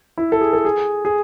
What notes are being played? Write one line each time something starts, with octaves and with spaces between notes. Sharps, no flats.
E4
A4
G#4
A4
G#4
G#4